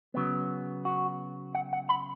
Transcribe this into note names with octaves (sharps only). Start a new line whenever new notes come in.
C#3 F#3 B3
F#4
F#5
F#5
B5